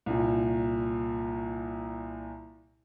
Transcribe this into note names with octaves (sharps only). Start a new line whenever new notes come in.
C2 A#2